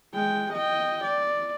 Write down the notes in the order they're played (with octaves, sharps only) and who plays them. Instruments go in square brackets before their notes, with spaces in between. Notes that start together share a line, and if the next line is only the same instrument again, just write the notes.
[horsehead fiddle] G#3 G5
D#5 G5
D5